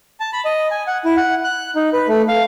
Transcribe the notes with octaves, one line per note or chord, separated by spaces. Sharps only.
A5
B5
D#5
G#5
F#5
E4
F#5
F#6
D#4
B4
A3
F5